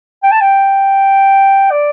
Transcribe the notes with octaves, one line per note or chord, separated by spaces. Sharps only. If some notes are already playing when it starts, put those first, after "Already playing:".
G5
A5
G5
D5